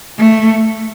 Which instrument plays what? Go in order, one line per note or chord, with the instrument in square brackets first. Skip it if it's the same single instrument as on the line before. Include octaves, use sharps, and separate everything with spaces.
[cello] A3